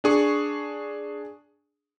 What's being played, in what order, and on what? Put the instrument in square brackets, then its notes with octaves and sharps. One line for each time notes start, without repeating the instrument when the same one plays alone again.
[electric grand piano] D4 G#4 C#6